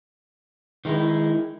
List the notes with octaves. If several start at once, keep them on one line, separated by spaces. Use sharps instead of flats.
D#3 G#3 D#4 E4